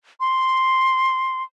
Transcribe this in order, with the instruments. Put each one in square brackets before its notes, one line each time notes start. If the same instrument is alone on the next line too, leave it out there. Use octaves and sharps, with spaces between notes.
[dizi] C6